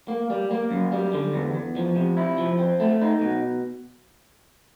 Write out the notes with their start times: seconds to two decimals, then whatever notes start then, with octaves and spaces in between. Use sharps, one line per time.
0.08 A#3
0.30 G3
0.51 A#3
0.71 F#2
0.92 G3
1.13 D3
1.33 E2
1.54 E2
1.76 F3
1.96 C3
2.17 E4
2.38 F3
2.59 C4
2.80 A3
3.02 D#4
3.21 B2